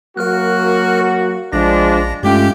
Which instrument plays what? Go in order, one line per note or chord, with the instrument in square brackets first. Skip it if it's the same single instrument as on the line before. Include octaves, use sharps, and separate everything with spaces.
[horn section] F#3 A#3 F#4 [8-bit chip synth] A#4 F6 F#6
[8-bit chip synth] A#1 A#6 [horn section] F3 G#3 D4
[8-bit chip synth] G2 G#3 C#4 [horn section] A3 F4 G4